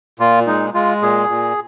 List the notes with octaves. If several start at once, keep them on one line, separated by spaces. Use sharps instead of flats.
A#2 F4
G#3 D#4
G#3 F4
A#2 G#4
A#2